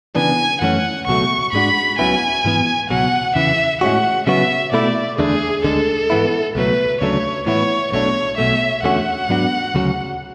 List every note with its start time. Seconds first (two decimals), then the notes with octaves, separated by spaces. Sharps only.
0.15 C#3 E3 B3 D4 G#5
0.61 F#2 E3 A3 C#4 F#5
1.07 C#2 B2 F#3 A3 C#6
1.53 G#2 G#3 D4 F#4 B5
1.98 C#2 C#3 F#3 B3 E4 G#5
2.45 G#2 E3 B3
2.89 C#2 B2 F#3 F#5
3.35 E2 C#3 E3 E5
3.81 A2 G#3 C#4 F#4 F#5
4.27 C#3 F#3 B3 F#4 E5
4.72 B2 A3 E4 D5
5.18 E2 D3 A3 D4 G#4
5.64 D2 D3 G#3 A4
6.10 G#2 E3 B3 E4
6.55 C#2 B2 F#3 A3 B4
7.01 D2 C#3 F#3 A3 D4 C#5
7.46 A2 E3 B3 E4 C#5
7.92 B1 B2 A3 D4 C#5
8.37 B1 B2 A3 E5
8.83 E2 D3 A3 C#4 F#4 F#5
9.29 G#2 F#3 B3 D4 F#4
9.75 D2 C#3 F#3